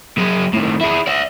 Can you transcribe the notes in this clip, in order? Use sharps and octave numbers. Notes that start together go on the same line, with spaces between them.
F#3 G#4
A2 D#3
E4 G#4
D5 E5